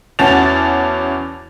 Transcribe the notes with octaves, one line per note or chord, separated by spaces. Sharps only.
E2 C#4 F#4 A5 A6 F7